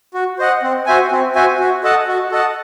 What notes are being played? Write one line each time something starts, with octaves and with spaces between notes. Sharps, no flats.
F#4
C5 D#5 F#5
C4
F#4 C5 E5 G#5
C4
F#4 C5 E5 G#5
F#4
A4 D#5 F#5 A5
F#4
A4 D#5 F#5 A5